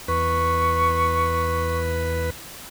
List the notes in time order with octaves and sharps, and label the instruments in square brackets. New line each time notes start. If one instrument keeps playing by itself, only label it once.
[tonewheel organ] E2 B4 [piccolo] C#6